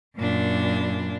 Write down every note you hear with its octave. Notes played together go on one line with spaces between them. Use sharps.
F#2 A#2 D4